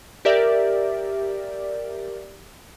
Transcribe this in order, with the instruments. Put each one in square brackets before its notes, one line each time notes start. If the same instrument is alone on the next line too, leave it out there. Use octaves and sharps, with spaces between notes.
[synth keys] G4 A#4 D5 E5